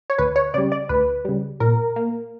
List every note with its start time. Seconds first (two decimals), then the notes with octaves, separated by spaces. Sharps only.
0.10 C#5
0.18 D2 B4
0.36 C#5
0.54 C#3 G3 D5
0.72 D5
0.89 D2 B4
1.25 C#3 G3
1.60 A#2 A#4
1.96 A#3